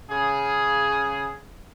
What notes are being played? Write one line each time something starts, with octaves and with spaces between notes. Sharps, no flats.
C#3 G#4